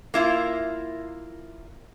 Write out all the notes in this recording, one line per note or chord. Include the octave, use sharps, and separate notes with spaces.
A#3 E4 F4